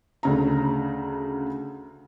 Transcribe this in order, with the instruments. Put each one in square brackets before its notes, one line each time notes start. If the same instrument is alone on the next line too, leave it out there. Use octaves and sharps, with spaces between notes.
[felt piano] D2 C#3 A#5